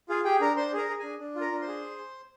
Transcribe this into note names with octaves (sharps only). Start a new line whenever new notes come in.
F4 G#4 F5
G4 G#4 G5
D4 A#4 A#5
D4 C5 C6
G#4 A#4 A#5
G#4
D4 G#4 G#5
D4
F4
A#4 A#5
D4
C5 C6
G#4